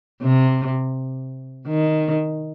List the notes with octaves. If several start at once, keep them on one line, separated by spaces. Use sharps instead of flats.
C3
D#3